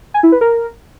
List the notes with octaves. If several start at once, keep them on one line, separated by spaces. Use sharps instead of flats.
G#5
E4
B4
A#4